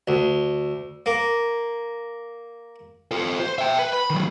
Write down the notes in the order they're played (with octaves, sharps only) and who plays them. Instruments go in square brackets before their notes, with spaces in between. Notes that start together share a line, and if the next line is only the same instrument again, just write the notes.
[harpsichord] D2
A#3
[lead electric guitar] F4 A4
C5
E5 G5
B4
B5
D#3 F#3